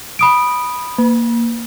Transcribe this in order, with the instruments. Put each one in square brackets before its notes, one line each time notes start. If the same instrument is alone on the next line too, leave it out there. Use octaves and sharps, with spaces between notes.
[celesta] B5 D#6 D7
[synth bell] A#3